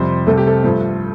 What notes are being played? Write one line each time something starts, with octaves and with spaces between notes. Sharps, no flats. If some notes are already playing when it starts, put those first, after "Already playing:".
Already playing: F2 C3 G3 C5
C2 C3 A3 A4
G4
A4
G2 F3 A3